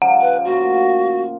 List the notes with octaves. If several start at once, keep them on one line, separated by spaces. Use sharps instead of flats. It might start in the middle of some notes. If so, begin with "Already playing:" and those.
C#3 F3 G3 F#5
B4
A2 A#3 F4 F#4